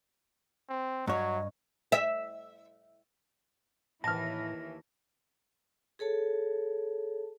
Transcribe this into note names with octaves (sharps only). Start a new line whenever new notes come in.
C4
G2 F#3 C#5 D#5
E5
D#2 A2 E3 A5 F6 A#6
G#4 A4 C#5 A5